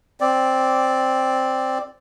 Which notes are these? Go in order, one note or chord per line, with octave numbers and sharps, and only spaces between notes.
C4 D5